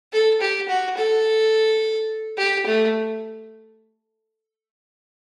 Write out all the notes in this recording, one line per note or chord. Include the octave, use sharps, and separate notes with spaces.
A4
G4
F#4
A4
G4
A3